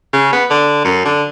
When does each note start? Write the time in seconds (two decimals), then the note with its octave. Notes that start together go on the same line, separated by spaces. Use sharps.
0.13 C#3
0.33 B3
0.50 D3
0.84 F#2
1.05 D3